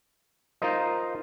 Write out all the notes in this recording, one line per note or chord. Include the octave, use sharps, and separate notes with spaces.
D#4 F4 A#4 C5 D#5